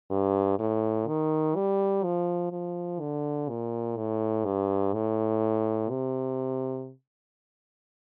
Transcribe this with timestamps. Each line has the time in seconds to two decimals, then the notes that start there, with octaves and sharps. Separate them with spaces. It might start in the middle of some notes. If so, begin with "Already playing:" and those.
0.11 G2
0.59 A2
1.08 D#3
1.56 G3
2.04 F3
2.52 F3
3.00 D3
3.49 A#2
3.97 A2
4.45 G2
4.93 A2
5.90 C3